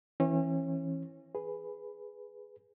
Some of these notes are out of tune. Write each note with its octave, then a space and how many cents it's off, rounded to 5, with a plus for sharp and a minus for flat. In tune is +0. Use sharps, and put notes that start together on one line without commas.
E3 +0 C#4 -35
G#4 +0 B4 +0